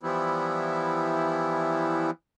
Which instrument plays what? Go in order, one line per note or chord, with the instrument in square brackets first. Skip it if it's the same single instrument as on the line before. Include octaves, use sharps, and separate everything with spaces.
[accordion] E3 F3 G3 B3 E4